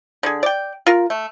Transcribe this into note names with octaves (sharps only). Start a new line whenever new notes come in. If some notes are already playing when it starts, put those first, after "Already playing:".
D3 G#4
D5 G5
F4 A#4
A3